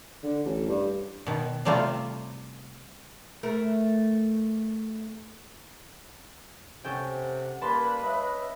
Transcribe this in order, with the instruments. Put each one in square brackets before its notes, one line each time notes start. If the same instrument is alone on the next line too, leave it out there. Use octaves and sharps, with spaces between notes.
[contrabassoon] D3
A1
G2
[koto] B2 D#3
C3 G3 A3 C4 F4
[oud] A3 A#4
[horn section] C3 F#5 [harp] C#4 A4 G5
[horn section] G3 A#3 [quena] B4 [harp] A5 B5 C6
[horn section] C#5 D#5 E5